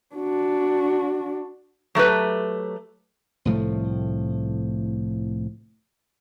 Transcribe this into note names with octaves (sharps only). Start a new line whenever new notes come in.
D4 F#4
F#3 A3 G4 B4
C2 A2 F3 A3